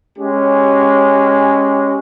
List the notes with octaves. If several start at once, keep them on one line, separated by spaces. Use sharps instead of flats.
G#3 C#4 G4